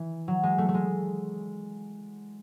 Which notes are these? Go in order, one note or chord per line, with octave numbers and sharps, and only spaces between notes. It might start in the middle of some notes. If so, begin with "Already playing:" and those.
Already playing: E3
F#3
G#3
A3
A3
G#3